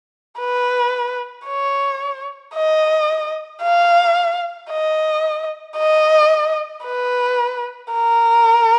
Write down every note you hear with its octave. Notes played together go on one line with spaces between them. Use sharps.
B4
C#5
D#5
F5
D#5
D#5
B4
A#4